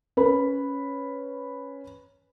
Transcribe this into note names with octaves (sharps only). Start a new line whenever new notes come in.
C#4 B4 B5